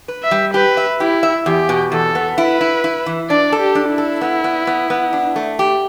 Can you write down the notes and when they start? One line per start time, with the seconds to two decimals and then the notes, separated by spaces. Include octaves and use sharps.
0.08 B4
0.23 E5
0.31 G3
0.54 G4 B4
0.77 E5
1.00 E4 G4
1.23 E5
1.46 E2 G4
1.69 B2
1.92 E2 A4
2.15 B3
2.38 E4 B4
2.61 E4
2.84 E4
3.06 E3
3.29 D4 D5
3.52 A4
3.60 G4
3.75 D4
3.91 E4
3.98 A4
4.21 B3
4.44 B3
4.67 B3
4.90 B3
5.13 D4
5.36 A3
5.59 G4